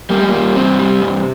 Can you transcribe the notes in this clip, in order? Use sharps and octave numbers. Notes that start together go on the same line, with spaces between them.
G3 A#3
G#3
A#2 G3 A#3
G2 C3 C4
G3
G2